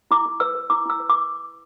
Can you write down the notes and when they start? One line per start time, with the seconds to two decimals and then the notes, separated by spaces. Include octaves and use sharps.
0.11 E4 D6
0.26 E4
0.40 B4 E6
0.55 B4
0.70 E4 D6
0.85 E4 E6
1.00 B4
1.10 D6